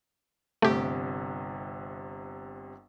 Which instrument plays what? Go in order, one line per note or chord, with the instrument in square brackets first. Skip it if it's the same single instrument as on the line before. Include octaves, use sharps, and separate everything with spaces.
[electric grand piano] G1 C3 [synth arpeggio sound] A3 G4